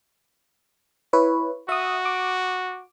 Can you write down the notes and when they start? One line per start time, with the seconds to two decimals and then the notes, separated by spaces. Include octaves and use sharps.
1.13 E4 B4 C#5
1.69 F#4 E5 D#6
2.05 D6